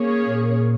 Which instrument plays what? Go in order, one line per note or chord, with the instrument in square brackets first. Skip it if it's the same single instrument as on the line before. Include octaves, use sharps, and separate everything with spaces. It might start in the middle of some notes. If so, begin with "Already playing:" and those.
Already playing: [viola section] A#3 C#4 G#4 C#5
[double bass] A#2